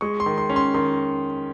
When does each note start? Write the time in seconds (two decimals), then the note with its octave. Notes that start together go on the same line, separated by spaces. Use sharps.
0.01 G#3 C#6
0.20 C6
0.26 D#3
0.38 C6
0.50 C#4
0.56 C6
0.74 D#3 C6